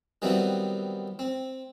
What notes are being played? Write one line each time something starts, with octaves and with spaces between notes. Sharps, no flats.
D#3 F#3 G3 B3 C4 E4
C4